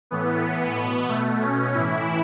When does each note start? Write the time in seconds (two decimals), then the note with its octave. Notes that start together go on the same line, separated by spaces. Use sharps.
0.11 A2 E3 B3
0.44 A2 E3
0.76 B2
1.08 B2 A3
1.42 B2 C#4
1.74 A2 E3 E4